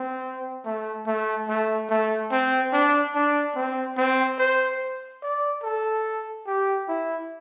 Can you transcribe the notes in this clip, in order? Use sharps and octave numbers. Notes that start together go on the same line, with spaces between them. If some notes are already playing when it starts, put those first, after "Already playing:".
Already playing: C4
A3
A3
A3
A3
C4
D4
D4
C4
C4
C5
D5
A4
G4
E4